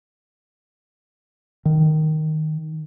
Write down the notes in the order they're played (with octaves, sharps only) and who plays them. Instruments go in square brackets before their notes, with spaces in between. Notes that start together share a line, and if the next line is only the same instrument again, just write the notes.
[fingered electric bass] D#3